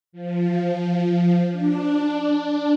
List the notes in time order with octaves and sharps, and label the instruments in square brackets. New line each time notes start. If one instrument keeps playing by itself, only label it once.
[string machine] F3
D4